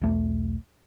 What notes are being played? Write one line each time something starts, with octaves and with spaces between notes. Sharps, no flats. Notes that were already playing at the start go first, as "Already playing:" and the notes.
B1 E2 A3